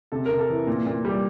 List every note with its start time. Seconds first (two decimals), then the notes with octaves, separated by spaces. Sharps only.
0.12 C3 A4
0.26 C3 A#4
0.39 A4
0.50 E3
0.67 A#2
0.87 A#2
1.05 G3